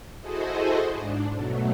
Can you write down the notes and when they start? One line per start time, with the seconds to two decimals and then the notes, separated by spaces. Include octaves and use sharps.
0.21 E4 F#4 G#4 A4 C5 D#5
0.95 G#2 D4
1.34 B2 F#3 A3